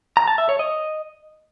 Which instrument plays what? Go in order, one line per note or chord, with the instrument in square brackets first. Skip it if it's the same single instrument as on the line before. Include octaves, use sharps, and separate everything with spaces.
[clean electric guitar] A#5
A5
E5
C#5
D#5